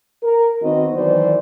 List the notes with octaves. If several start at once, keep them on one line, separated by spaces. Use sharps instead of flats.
A#4
D#3 B3 C4 F#4 D#5
D#3 E3 F#3 C5 D5